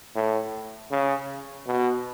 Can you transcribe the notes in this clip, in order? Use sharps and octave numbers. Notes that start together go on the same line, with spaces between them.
A2
C#3
B2